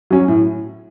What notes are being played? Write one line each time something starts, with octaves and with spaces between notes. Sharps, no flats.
F#3 C#4
A2